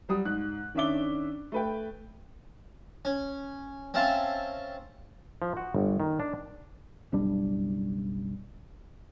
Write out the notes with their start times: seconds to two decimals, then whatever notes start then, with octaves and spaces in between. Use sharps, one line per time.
0.09 F#3 G3 D#6
0.25 G#2 F#6
0.75 D#3 C#4 D4 E5 D6 G7
1.52 A3 B4 G5
3.05 C#4
3.94 C4 C#4 E5 F5 A5 C6
5.42 F3
5.57 F#4
5.74 G1
6.00 D#3
6.20 D4
7.12 F#1 B1 G3 D4